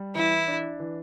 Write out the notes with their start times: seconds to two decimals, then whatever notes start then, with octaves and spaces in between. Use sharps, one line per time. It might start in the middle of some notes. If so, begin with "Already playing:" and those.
Already playing: G3
0.15 E3 E4
0.47 D4
0.80 E3